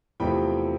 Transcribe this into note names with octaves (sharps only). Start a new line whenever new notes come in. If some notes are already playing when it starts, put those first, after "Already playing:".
E2 C3 F3 A3 C4 G5 B5